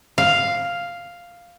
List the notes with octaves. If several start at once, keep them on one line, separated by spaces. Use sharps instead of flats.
F5